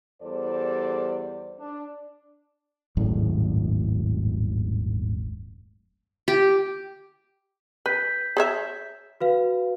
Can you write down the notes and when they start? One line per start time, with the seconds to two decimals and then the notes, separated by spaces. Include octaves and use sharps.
0.22 E2 G3 A4 C5 D5
1.59 D4
2.97 D#1 G#1 F#2 A2
6.28 G4
7.86 B4 G6 B6
8.37 G#4 C#5 E5
9.20 F#4 B4 F5